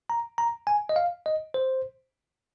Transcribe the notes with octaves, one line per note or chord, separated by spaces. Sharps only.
A#5
A#5
G#5
D#5
F5
D#5
C5